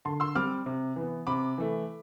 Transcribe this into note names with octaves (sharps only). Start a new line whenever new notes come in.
D3 A5 C6
C6 E6
G3 C4 D6 F6
C3
E3 B3
C3 B5 D6
E3 A3